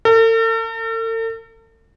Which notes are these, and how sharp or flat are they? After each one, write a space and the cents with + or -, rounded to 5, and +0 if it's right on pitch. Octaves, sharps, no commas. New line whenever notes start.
A4 +45